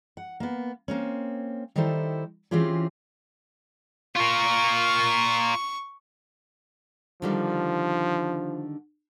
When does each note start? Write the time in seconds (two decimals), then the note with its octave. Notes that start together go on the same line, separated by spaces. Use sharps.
0.17 F#5
0.40 A#3 B3
0.88 A#3 C4 C#4
1.76 D#3 G3 D#4 E4 A4 C5
2.51 E3 C4 C#4 F4 G4 G#4
4.16 F4 A#4 C#6
7.22 D3 D#3 F3 G3